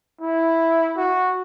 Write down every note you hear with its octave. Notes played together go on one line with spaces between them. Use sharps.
E4
F#4